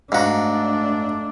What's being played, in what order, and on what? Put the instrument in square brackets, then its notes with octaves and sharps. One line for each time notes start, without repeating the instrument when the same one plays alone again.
[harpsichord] G#2 F#4 [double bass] A3 D4 [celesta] D#5 F5 A#5